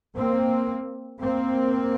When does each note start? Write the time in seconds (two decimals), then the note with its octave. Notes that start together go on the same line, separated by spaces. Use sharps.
0.17 A#3 C4
1.22 A#3 C4